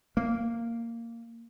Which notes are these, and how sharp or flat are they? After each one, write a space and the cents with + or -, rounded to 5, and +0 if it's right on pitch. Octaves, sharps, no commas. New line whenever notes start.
A#3 -10